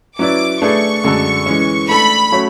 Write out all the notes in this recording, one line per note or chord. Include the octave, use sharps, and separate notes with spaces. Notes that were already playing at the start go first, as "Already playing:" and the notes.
F#3 C#4 E4 B4 D5 D6
A3 D4 G#4 B4 D5 C#6
F#2 D3 G#3 D4 A4
E3 G#3 C#4
A3 D4 A4 B5
F#3 A3 C#4 F#4 C#5